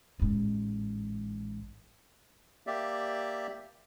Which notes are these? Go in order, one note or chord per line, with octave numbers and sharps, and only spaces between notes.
A1 G#2
A#3 G4 D5 E5